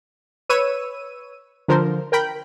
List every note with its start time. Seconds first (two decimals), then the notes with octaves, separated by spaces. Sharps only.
0.49 B4 C#5 E6 D#7
1.68 D3 F3 A#4 C5
2.12 A#4 G5 B5